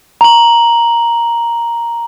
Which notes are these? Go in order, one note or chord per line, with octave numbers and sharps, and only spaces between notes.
A#5 F#7